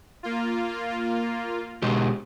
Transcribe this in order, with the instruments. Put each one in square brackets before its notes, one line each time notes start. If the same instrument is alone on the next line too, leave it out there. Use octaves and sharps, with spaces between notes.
[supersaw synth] A#3 F4
[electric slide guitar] B2 G#3 G4